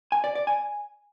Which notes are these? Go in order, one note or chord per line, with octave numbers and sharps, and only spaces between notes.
G#5
D5
D5
G#5